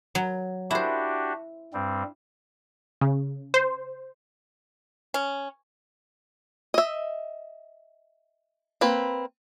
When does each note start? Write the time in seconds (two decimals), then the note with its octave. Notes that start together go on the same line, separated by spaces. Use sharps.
0.15 F#3
0.71 D4 E4 F#4 G4 C5
1.74 G2 G3 C4
3.01 C#3
3.54 C5
5.14 C#4
6.74 D#5 E5
8.81 A#3 C4 B4